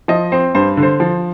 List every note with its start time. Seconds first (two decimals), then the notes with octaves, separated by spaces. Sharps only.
0.08 F3 D#5
0.32 C4 C5
0.55 G2 C5
0.77 D3
0.83 C5
1.00 F3